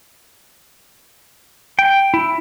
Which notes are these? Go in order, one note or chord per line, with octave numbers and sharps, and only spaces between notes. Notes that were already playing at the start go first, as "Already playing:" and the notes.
G5
E4